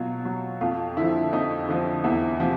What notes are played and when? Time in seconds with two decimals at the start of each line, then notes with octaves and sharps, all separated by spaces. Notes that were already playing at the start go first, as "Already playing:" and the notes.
Already playing: B2 F#3 F4
0.25 F#3
0.61 F2 F4
0.97 D3 F3 E4
1.33 F2 D#4
1.69 D3 F3
2.04 E2 E4
2.40 C3 F3